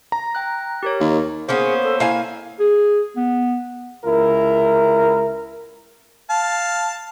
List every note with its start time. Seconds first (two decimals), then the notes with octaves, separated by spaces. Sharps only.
0.12 A#5
0.35 G5 F#6
0.83 G4 A#4 C#5
1.00 D#2
1.49 A#3 B3 C#4 G#4 C5
1.83 A4
2.00 A#3 E4 F5 G#5
2.60 G#4
3.16 B3
4.05 C#2 E4 A#4
6.30 F5 A5